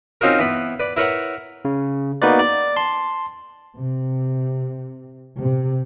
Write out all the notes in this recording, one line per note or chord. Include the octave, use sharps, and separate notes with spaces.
C4 C#4 D#4 F4 F#4 A#4
E3 B3 B4
B4 D5
E4 A#4 B4 C#5 F#5
C#3
A#3 B3 D#4 F#4 B4 D5
D5
A5 C6
C3
C3